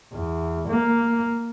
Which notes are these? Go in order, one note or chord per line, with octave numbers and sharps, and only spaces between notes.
E2
A#3